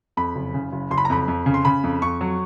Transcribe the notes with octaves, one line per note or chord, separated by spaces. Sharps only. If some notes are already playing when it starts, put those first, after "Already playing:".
F2 B5
F#1
C#3
F#1
F#1 C6
B5
A#5
F2 B5
F2
C#3
C6
C#3 B5
F2
F2 C#6
F#3